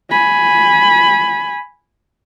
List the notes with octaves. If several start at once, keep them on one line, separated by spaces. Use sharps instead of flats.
G#5 B5